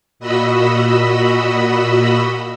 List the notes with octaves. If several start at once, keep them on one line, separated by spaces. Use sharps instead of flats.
A#2 F#4 D#5 B5 E6